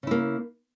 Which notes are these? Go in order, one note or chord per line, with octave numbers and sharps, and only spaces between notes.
C#3 A#3 E4